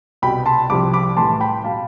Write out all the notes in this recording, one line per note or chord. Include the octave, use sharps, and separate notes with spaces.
C2 B2 G3 G5 B5
A5 C6
C2 C3 F3 B5 D6
B5 D6
A2 E3 G3 A5 C6
G5 B5
B2 G3 F5 A5